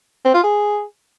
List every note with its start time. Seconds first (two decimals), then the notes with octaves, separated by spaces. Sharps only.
0.25 C4
0.34 F4
0.43 G#4